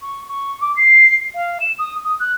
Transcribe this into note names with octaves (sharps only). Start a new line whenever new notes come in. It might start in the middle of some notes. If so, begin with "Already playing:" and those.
C#6
C#6
D6
C7
F5
E7
D#6
D#6
F#6